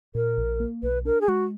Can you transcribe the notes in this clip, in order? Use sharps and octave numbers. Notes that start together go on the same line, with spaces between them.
A#2 A#4
A#1
A#3
B1 B4
D4 A#4
G#4
G#3 F#4